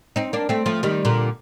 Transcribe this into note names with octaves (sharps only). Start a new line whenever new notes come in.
C4 D#4
A#3 D4
A3 C4
F3 A3
D#3 G3
A#2 D3